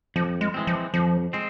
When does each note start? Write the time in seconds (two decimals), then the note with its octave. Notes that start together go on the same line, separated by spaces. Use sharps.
0.16 F2 F3
0.41 G#3
0.54 E3 G#3 C4
0.67 F3
0.94 F2 F3
1.33 G#3 C4